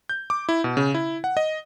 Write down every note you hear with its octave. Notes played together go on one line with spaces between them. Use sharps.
G6
D6
E4
B2
C#3
E4
F#5
D#5